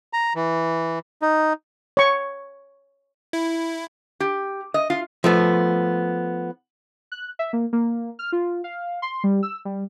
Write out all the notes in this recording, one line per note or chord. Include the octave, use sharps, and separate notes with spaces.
A#5
E3
D#4
C#5 C#6
E4
G4
D#5
F4
F3 A3 B3
F#6
E5
A#3
A#3
F6
F4
F5
C6
G3
E6
G3